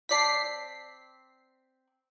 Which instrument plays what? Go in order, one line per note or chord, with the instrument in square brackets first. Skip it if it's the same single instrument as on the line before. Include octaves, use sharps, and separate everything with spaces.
[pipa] C4 D5 A5 [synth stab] B6 C7